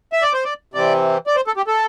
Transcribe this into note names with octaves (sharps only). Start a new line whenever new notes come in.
E5
D5
C5
D5
C3 E3 C4 D5
D5
C5
A4
G4
A4